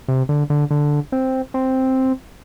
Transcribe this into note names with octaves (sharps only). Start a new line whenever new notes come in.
C3
D3
D3
D3
C4
C4